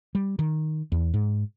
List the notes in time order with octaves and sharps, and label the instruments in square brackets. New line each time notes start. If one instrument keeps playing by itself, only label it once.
[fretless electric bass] G3
D#3
E2
G#2